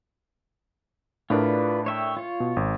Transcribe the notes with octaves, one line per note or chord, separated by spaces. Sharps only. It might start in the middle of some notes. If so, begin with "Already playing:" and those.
A2 D4 F4 A#4 B4 D5
C#5 E5 G5
F4 C#5
B2
G#1